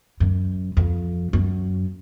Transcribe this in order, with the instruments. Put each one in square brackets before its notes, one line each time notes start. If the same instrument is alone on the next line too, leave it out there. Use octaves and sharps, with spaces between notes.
[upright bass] F#2
F2
F#2